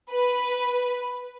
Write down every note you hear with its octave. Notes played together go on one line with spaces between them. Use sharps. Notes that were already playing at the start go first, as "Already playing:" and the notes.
B4